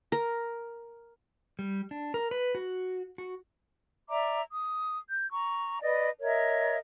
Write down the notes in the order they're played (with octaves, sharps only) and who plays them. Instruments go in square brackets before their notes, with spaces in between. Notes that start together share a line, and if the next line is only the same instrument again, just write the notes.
[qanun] A#4
[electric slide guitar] G3
D4
A#4
B4
F#4
F#4
[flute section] D5 E5 A#5 D6
D#6
G6
A#5 C#6
B4 D5 D#5
A#4 C#5 D#5 E5